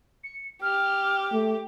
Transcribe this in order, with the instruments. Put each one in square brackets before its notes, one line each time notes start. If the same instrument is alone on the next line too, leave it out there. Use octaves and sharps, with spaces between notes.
[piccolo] C#7
[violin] G4 [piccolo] F6
[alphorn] A3